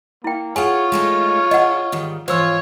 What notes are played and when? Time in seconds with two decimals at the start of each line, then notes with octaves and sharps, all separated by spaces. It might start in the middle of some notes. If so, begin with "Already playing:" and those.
0.24 A#3 E4 G5
0.56 F4 G#4 C#5 F5 F#5 G#5
0.92 G#3 A3 D#4
1.51 D4 G#4 D#5 F#5
1.92 G#2 D#3 G3
2.28 G#2 E3 F3 F4 C5 C#5 E6